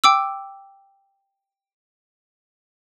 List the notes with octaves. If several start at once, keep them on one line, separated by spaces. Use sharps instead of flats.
G5 D6 E6